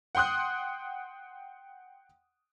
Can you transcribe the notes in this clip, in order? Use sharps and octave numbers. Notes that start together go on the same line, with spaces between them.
F#5 G5 C6 D#6 F#6